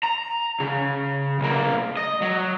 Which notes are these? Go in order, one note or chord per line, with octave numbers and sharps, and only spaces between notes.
A#5
C#3
B1 A#3
D#5
F#3